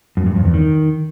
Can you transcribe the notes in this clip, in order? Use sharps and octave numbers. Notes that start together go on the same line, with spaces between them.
F#2
G2
F2
E2
D#3